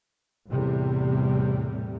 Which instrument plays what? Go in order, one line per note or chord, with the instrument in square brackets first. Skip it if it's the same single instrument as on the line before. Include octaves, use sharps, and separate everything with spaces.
[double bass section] E2 A2 C3 G3